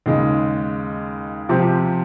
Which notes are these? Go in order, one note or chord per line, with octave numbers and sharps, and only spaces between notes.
D#2 C#3 G#3
C3 F3 C4 G4